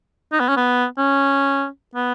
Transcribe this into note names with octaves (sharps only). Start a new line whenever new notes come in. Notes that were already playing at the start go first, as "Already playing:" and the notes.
D#4
B3
C#4
B3
C#4
B3